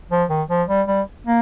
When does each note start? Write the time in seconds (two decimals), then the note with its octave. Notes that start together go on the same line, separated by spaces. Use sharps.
0.11 F3
0.30 D#3
0.50 F3
0.69 G3
0.88 G3
1.27 A#3